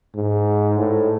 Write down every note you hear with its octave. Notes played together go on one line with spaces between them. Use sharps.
G#2
A2